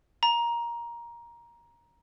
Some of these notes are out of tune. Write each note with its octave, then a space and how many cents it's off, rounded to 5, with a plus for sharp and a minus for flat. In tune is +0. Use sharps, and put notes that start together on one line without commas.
A#5 +15